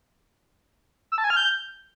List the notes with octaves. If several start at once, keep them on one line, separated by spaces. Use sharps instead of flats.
E6
A5
G#5
F6
G6